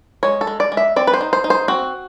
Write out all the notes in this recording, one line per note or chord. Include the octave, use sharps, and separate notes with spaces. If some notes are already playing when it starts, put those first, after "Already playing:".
G#3 C#5
A4
G#3
D5
G#3
E5
C4 D5
B4
C5
D#4
C5
D#4
C5
C4 F#4